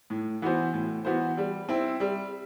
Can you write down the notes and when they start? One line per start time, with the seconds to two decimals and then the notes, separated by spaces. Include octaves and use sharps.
0.10 A2
0.42 E3 B3 F#4 C5
0.73 A2
1.05 E3 B3 F#4 C5
1.37 G3
1.69 C4 E4
2.00 G3